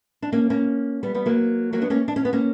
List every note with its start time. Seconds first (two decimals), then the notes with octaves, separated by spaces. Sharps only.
0.22 D4
0.32 A#3 C#4
0.50 A#3 C#4
1.03 G3 B3
1.14 G3 B3
1.26 F#3 A#3
1.73 F#3 A#3
1.81 B3 D4
1.90 A#3 C#4
2.08 D4
2.16 C#4
2.25 B3
2.33 A#3 C#4